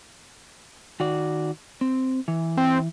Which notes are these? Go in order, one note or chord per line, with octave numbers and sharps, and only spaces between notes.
D#3 F#4 D5
C4
E3
C4